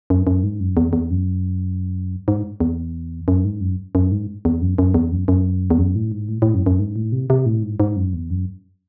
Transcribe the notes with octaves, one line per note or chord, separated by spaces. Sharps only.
F#2
F#2
G#2
F#2
E2
E2
F#2
G#2
E2
F#2
G#2
F#2
F#2
G#2
E2
F#2
F#2
E2
F#2
F#2
E2
F#2
A2
G#2
A2
A2
F#2
F#2
G#2
A2
C3
C3
A2
G#2
G#2
F#2
E2
F#2